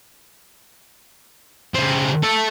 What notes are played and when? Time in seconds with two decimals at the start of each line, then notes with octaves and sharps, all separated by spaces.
1.74 C#3 C4
2.23 A4 E5